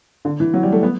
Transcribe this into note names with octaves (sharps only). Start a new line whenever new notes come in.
D3
E3
F#3
G3
A3
B3